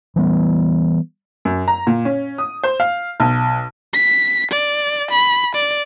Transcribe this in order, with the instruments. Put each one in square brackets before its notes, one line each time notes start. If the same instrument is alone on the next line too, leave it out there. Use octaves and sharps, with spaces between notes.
[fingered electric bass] E3 G3 B3
[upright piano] F#2
A#5
A#2
C#4
D#6
C5
F5
B1
[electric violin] B6
D5
B5
D5